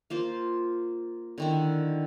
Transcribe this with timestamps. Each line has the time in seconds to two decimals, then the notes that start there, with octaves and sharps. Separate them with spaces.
0.10 A#3 F4 C5
1.38 D3 D#3 E4